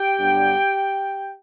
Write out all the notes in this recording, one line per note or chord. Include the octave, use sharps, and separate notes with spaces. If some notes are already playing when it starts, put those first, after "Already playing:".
Already playing: G4 G5
G2 D3 F#3 B3 D4